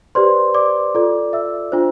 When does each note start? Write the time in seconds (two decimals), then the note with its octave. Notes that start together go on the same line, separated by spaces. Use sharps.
0.15 G4 B4 C5 D5 C6
0.54 D5 D6
0.95 F4 A4 D5
1.33 E5 E6
1.72 D4 F4 C5